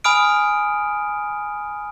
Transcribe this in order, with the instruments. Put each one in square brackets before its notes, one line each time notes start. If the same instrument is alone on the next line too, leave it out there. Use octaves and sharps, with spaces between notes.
[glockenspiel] G#5 B5 D#6 F6 D7